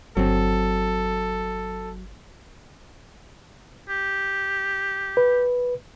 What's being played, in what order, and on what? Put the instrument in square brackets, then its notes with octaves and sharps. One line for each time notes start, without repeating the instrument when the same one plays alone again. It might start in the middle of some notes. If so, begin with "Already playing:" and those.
[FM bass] G1 [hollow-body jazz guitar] F#3 C4 [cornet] A4
[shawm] G4
[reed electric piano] B4